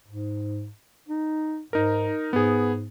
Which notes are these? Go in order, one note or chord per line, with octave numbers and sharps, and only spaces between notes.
G#2
D#4
G#2 D#4 A#4
G#2 B3 G#4